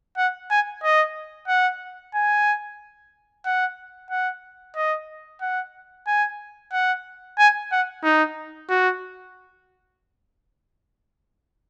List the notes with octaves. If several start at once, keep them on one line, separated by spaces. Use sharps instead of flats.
F#5
G#5
D#5
F#5
G#5
F#5
F#5
D#5
F#5
G#5
F#5
G#5
F#5
D#4
F#4